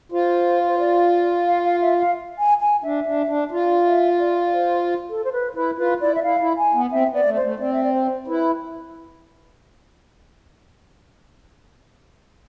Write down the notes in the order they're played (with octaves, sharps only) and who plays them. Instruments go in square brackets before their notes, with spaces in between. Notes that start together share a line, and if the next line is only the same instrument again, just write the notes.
[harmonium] F4 [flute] C5
[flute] C5
D5
F5
F5
E5
F5
G#5
G#5
[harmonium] D4 [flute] E5
[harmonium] D4
D4
[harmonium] F4 [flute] D5
[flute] E5
D5
C5
A4
C5
B4
[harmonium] E4 [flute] B4
[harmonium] F4 [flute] B4
[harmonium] E4 [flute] D5
[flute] E5
[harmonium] E4 [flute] F5
[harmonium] E4
[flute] G#5
[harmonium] B3
[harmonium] C4 [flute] E5
[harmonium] B3
[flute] D5
[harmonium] A3
[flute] C5
[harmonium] A3
[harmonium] C4 [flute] D5
[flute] E5
D5
C5
[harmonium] E4 [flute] B4